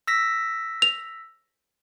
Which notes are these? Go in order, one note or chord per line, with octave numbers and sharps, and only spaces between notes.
E6 A#6 B6
F7